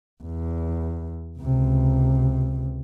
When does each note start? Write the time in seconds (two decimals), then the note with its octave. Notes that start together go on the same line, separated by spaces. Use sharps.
0.23 E2
1.38 C#2 C3